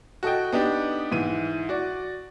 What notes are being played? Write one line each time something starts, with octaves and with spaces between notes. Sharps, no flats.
F#4 A4 D#5 G5
B3 D4 D#4 G4
G#2 E3 D#7
F#4 D5